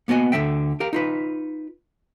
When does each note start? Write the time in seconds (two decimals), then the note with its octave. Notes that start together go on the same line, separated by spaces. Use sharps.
0.08 A#3 B3 F#4 D#5 G#5
0.32 D2 D3 G#3 E5 G5
0.80 G4 A#4 F5
0.93 D#4 F4 B4